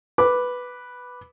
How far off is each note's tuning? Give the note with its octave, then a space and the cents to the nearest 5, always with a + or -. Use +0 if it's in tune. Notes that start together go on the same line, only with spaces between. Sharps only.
B4 +0 D6 +0